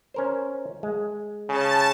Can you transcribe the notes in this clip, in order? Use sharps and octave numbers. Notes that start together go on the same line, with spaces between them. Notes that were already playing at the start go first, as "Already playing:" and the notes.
C#4 A#4 C5
G#3
C#3 A5